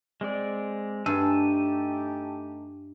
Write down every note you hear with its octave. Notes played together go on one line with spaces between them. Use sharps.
G#3 C4 D5
G2 A3 D#4 G4 G#5 A5 E6